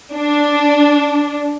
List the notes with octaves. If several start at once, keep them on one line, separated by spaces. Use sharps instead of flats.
D4